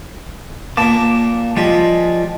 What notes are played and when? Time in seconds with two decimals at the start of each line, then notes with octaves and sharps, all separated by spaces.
0.77 A#2 A#3 A5 D6
1.57 F3 G3 G#3